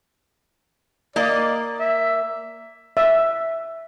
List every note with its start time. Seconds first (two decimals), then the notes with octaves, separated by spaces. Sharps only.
1.16 A#3 D5 D#5
1.80 E5
2.97 E5